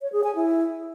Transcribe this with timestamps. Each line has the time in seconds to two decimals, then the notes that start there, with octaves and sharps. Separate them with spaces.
0.01 C#5
0.12 G#4
0.24 G#5
0.35 E4